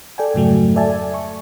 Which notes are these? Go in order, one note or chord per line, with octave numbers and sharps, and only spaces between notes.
A4 D5 G5 G#5
F2 G#2 C#3 F#3 A3
A4 D5 E5 G#5 A5
C#6